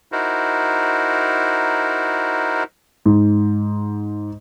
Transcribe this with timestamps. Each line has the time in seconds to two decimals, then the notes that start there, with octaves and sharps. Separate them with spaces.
0.12 D#4 E4 F#4 A#4 C5
3.06 G#2